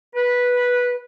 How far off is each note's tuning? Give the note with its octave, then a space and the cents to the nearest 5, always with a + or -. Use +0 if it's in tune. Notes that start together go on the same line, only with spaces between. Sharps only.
B4 -10